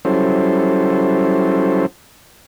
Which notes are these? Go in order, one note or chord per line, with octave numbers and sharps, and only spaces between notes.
F#3 G3 C#4 E4 A4 C5